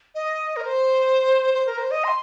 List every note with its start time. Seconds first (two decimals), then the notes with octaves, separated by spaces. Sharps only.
0.15 D#5
0.56 A#4
0.66 C5
1.54 C5
1.67 A#4
1.78 C5
1.91 D#5
2.04 C6